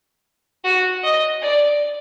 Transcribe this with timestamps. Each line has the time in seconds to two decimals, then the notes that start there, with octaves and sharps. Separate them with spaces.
0.64 F#4
1.03 D#5
1.41 D5